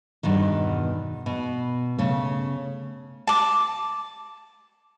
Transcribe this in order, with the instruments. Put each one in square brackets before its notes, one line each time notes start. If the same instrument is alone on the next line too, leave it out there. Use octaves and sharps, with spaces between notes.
[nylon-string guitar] E2 G2 B2 D#3
B2
C#3 A3
[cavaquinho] A5 D6